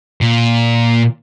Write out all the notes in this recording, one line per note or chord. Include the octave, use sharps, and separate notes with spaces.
A#2